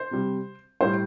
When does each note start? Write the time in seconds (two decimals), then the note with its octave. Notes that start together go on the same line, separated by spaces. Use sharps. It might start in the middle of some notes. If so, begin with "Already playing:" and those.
Already playing: C5
0.11 C3 G3
0.81 A2 G3 C5